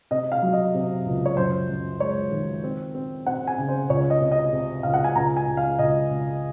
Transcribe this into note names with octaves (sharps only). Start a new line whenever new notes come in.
C3 D#5
F5
F#3
D#5
C3
C#2
C#5
F#2 C5
F#2
G#3 C#5
D#3
C4
C4
C4 F#5
G#5
C#3
C5
C#2 C#5
D#5
C3
D#5
C3
C#2 F5
F#5
G#5
C#2 A#5
G#5
C#2
F5
C#2 D#5
C#2